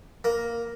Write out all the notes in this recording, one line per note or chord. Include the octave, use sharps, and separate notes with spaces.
A#3